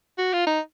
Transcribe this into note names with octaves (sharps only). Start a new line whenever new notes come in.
F#4
F4
D#4